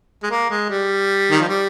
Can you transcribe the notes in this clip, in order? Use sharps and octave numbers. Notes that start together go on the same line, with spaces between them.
G#3
A#3
G#3
G3
D#3
F3
G3